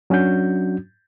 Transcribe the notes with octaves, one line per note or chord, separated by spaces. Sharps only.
F#3 C#4 D4 F#4 G6